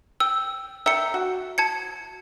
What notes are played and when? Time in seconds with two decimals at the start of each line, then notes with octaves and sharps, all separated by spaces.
0.20 G5 E6
0.86 A#4 E5 G5 E6 C#7
1.14 F#4
1.58 A5 G#6 C#7